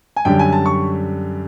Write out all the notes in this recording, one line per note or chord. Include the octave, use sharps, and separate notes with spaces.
G#5
F#2 D3 G3 G5
G#5
A5
C#6